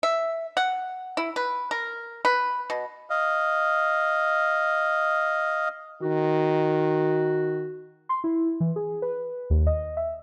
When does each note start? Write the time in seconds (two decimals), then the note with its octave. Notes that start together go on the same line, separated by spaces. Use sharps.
0.03 E5
0.57 F#5
1.17 E4
1.36 B4
1.71 A#4
2.25 B4
2.70 B2
3.10 D#5 F5
6.02 D#3 F#4
8.09 C6
8.24 E4
8.60 E3
8.76 G#4
9.02 B4
9.50 D#2
9.67 D#5
9.97 E5